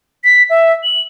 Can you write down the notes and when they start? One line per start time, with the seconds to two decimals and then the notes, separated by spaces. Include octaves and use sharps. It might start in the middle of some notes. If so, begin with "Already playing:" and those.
0.24 B6
0.50 E5
0.83 F#7